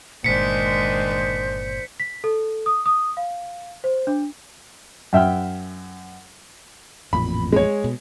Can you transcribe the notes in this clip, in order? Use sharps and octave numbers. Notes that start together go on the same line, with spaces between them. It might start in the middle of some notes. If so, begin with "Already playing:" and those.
G1 A#2 D#3 G#3 D4 C5 B6 C#7
B6
A4
D#6
D#6
F5
C5
D4
F#2 E5 G5 F6
A1 F2 A#2 B5
G#3 C#5
B2